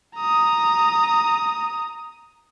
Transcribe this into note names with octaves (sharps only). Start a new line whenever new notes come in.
A#5 D#6